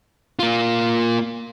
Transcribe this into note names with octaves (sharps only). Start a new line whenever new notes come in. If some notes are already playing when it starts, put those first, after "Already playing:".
A#3 F4